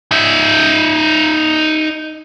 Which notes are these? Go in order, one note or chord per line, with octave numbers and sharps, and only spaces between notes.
D#4 E5